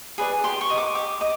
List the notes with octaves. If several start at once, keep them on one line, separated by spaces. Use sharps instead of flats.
G#4 B4 D5
G4 C6
C#6
A#4 D#5
D6
G4 D6
D#5 D6